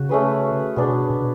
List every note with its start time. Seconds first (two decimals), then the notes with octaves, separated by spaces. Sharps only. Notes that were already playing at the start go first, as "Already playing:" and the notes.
Already playing: C#3 F#4
0.09 A3 C#4 G#4 B4
0.76 B2 B3 D4 G#4 D5
1.10 B2